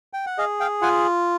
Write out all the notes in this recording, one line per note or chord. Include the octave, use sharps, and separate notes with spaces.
G5
F#5
G#4 D#5 F5
F5 G5
F4 F#5 G#5